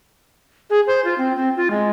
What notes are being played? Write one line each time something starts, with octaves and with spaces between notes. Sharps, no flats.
G#4
C5
F4
C4
C4
F4
G#3